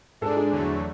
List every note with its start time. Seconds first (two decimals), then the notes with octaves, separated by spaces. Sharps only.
0.21 G#2 G#3 D4 A4
0.36 G#4
0.51 E2 D3 F#3 A3